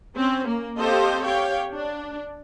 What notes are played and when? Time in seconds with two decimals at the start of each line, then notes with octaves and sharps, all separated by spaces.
0.17 C4 C#4
0.48 A#3
0.78 C4 G4 A4 C5 D#5 F5
1.24 G4 C#5 F5 G5
1.73 D4